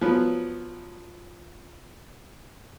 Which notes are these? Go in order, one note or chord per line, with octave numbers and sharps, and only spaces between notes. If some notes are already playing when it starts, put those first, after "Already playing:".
F3 F#3 B3